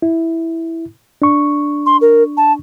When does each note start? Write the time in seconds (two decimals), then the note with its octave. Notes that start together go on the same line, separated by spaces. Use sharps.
0.02 E4
1.22 D4 C#6
1.86 C6
2.01 A#4
2.37 A5